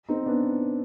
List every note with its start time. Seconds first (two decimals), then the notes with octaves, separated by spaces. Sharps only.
0.09 C4 D#4
0.26 B3 D4